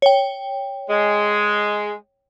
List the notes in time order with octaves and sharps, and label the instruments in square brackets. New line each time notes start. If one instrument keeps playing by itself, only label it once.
[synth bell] C#5 G5
[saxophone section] G#3